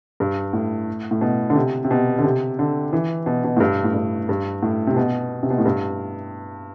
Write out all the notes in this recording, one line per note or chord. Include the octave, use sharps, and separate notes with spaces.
G2
A2
A2
B2
D3
C3
C3
B2
D3
C3
D3
E3
B2
B2
A2
G2
A2
G2
G2
A2
C3
B2
C3
B2
A2
G2